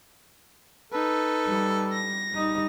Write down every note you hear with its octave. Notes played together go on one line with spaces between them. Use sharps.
D#4 A4 B4
G3
A#6
G3 D#4